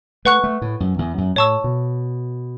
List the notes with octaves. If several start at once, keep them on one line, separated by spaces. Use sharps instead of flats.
A3 B4 F#5 C#6 F#6
A3
A2
F#2
E2
F#2
A2 C#5 A5 C#6 E6
B2